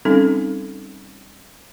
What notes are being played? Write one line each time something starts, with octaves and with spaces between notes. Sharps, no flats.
G3 C4 C#4 D#4 A4